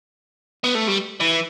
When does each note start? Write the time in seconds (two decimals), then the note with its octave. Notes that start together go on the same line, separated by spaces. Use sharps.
0.64 B3
0.75 A3
0.87 G3
1.20 E3